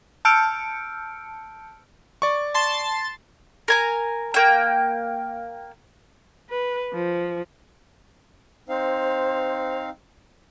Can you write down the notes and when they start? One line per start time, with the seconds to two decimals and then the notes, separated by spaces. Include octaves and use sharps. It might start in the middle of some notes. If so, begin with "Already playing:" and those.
0.25 A5 E6 F6 G6 C#7 D7
2.22 D5 C#6
2.54 A5 C6 A6
3.68 A#4 G#5 A#5
4.34 A#3 G5
6.50 B4
6.93 F3
8.69 C4 D#4 C5 F5